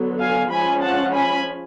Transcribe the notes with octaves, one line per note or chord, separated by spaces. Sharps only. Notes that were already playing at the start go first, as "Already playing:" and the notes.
Already playing: D3 F#3 B3
F5 G#5
F3 G#3 C#4 F4 G#5 B5
F#5 A5
G#5 B5